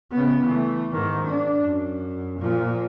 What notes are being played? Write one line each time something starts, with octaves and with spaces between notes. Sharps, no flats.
C#3 B3
E3 A3
G#2 D#3
D4
F#2
A#2 F3